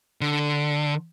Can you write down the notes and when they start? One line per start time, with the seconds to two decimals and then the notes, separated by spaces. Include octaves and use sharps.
0.21 D3